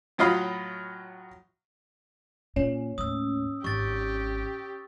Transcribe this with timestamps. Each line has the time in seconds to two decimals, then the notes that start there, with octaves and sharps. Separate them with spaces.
0.18 A2 F#3 F4 D#5 F5 B5
2.56 A#2 C#4
2.98 D#2 A2 D#6 E6
3.64 G#1 G4 C#6 A6